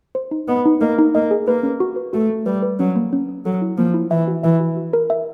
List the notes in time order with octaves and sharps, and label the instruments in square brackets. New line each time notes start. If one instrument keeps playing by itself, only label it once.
[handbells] C5
D#4
[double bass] B3 [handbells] D#5
[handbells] D#4
[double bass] A#3 [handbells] D#5
[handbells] D#4
[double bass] A#3 [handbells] D#5
[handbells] G#4
[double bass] A#3 [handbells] B4
[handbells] C#4
F#4
B4
[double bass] A3 [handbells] F#4
[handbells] A3
[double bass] G3 [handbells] B4
[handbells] B4
[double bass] F#3 [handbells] C#4
[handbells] A#3
C#4
C#4
[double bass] F#3 [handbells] A4
[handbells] E4
[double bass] F3 [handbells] A#3
[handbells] E4
[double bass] E3 [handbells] E5
[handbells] F#4
[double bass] E3 [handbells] E5
[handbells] F#4
F#4
A#4
E5